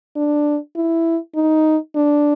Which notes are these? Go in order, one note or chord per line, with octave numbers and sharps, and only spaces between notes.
D4
E4
D#4
D4